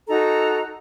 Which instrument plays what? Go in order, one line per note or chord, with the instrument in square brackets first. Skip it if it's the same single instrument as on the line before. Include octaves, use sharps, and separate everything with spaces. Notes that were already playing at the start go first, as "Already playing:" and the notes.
[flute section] D#4 F#4 A4 A#5